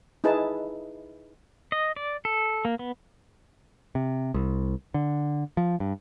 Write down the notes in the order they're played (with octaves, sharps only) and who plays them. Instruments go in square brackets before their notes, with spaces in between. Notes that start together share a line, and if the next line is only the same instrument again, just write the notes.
[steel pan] D#4 E4 G#4 B4 A5
[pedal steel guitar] D#5
D5
A4
A#3
B3
[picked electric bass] C3
C2
D3
F3
G2